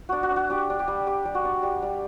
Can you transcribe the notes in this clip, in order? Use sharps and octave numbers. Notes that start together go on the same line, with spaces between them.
D4 F#4
F#4
D4
F#4
D4 G4
D4
G4
G3
G3 G4
G3
F#4
D4
G3
G3